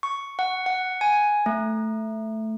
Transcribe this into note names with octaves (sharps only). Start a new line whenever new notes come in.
C#6
F#5
F#5
G#5
A3